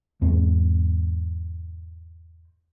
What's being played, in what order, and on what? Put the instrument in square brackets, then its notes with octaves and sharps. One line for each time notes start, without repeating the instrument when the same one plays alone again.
[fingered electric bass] E2 G#2 C4